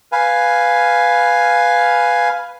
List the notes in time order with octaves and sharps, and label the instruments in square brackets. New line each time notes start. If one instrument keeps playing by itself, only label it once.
[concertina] B4 F5 G#5